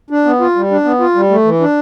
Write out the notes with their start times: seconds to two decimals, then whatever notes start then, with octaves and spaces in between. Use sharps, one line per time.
0.10 D4
0.25 B3
0.40 F4
0.56 G3
0.71 D4
0.85 B3
1.00 F4
1.15 G3
1.30 A3
1.45 E3
1.60 D4